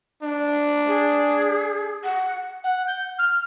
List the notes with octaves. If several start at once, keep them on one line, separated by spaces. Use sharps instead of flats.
D4
G#4
F#5
F#5
G6
F6